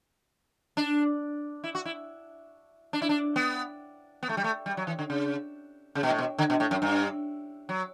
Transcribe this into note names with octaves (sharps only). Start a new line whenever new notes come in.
D4
E4
F#4
E4
D4
E4
D4
B3
B3
A3
G3
A3
G3
F#3
E3
D3
C#3
C#3
B2
A2
B2
D3
B2
A2
F#2
G2
F#3